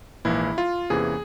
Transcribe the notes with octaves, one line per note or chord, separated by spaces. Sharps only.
A#1 G#2 E3 A#3 E4
F4
E2 C3 E3 A#3 C#4 G#4